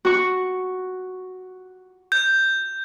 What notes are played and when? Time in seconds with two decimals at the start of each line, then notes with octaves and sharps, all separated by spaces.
0.05 F#4 C#6
2.12 G6